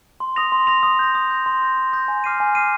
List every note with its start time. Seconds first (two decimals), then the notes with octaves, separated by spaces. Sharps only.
0.20 C6
0.36 D#6 A#6 F7
0.52 C6
0.67 D#6 A#6 F7
0.83 D#6
0.99 G6 A#6
1.15 D#6
1.31 G6 A#6
1.46 C6
1.62 D#6 G6 A#6
1.78 C6
1.93 D#6 G6 A#6
2.08 G#5
2.24 D6 F6 C7 D#7
2.40 G#5
2.55 D6 F6 C7 D#7